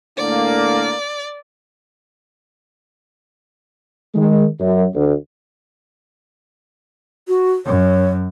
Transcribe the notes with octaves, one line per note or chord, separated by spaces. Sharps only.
A2 D3 A#3 D5
D#3 G#3
F#2
D2
F#4
F#2 C#5